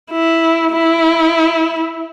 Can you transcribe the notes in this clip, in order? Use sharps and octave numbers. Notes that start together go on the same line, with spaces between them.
E4
E4